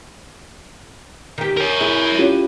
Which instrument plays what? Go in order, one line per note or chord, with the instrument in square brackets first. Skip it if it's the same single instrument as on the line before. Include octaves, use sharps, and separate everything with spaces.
[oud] D#3 G4
[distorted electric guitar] A#4 C#5
[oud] E4 G#4
[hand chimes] C#4 F4 G4